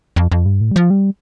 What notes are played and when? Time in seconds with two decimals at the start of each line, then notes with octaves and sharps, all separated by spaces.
0.16 F2
0.32 F2
0.46 G2
0.61 A2
0.71 G3
0.76 F3
0.90 G3